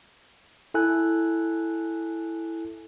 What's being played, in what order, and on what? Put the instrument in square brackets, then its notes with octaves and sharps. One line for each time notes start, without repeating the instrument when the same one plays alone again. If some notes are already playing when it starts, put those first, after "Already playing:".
[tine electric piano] E4 A4 G#5 F#6